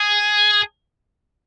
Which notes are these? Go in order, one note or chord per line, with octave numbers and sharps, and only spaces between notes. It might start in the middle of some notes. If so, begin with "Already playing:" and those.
Already playing: G#4